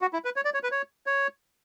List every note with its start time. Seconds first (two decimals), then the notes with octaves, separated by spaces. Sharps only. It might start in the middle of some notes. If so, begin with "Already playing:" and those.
0.01 F#4
0.13 E4
0.25 B4
0.36 C#5
0.45 D5
0.54 C#5
0.63 B4
0.71 C#5
1.06 C#5